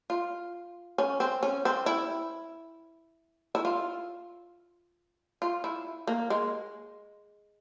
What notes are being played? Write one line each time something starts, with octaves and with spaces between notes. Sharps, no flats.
F4
C#4
C4
C#4
C4
E4
E4
F4
F4
E4
A#3
G#3